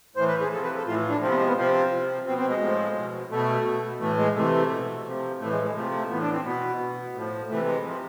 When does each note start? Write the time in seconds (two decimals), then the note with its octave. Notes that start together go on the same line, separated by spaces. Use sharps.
0.16 A2 C5
0.19 E3
0.27 B4
0.40 G#4
0.51 F3 A4
0.56 C3
0.63 B4
0.75 A4
0.86 A2 E3 F4
1.09 D4
1.21 C3 F3 C4
1.29 B3
1.39 G#3
1.47 B3
1.56 C3 F3 C4
1.91 C3 F3
2.26 B2 C4
2.38 C4
2.49 G#3
2.61 A2 F3
2.95 B2
3.30 B2 A3
3.66 B2
4.00 A2 E3 A3
4.17 G#3
4.35 C3 E3 A3
4.70 B2
5.05 C3 F3
5.40 A2 E3 A3
5.51 G#3
5.63 G#3
5.75 C3 F3 A3
5.92 A3
6.09 A2 E3 B3
6.22 D4
6.33 C4
6.44 B2 B3
6.79 B2
7.14 A2 F3
7.49 C3 E3 A3
7.66 G#3
7.84 C3 F3